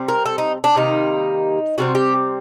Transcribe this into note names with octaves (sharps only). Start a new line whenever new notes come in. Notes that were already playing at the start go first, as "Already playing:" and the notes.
Already playing: C3 G3 C4
A#4
A4
D#4
D4
C3 D#3 G3 A#3 D#4
C3 G3 C4 F#4
G4